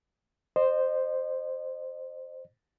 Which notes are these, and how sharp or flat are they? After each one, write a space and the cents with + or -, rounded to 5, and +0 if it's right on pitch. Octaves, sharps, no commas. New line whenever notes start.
C5 +0 D#5 -35